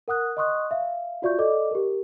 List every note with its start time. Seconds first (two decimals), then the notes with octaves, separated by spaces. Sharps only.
0.08 A#4 F#5 D#6 F#6
0.37 D#5 F#5 C6 C#6 D#6 F#6
0.71 E5 F5
1.22 F4 F#4 D5 E5 C#6 G6
1.38 A4 D5 D#5 D6
1.71 G4 A#4